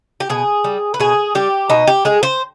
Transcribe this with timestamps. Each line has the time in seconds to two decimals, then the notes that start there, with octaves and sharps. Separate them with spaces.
0.20 G4
0.29 B2 G#4
0.64 G3
0.94 B4
1.00 B2 G#4
1.35 G3 G4
1.70 B2 D#4
1.87 G4
2.05 G#3 G#4
2.23 C5